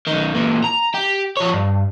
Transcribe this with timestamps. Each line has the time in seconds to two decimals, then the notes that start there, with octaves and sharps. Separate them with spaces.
0.07 B1 D#3
0.35 A#2 E3
0.64 A#5
0.94 G4
1.37 F3 C#5
1.54 G2